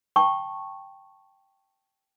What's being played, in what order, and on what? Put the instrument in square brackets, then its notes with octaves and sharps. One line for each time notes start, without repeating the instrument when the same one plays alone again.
[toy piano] G5 A5 C#6